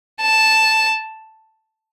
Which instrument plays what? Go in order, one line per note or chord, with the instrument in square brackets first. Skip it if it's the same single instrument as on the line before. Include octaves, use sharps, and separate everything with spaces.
[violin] A5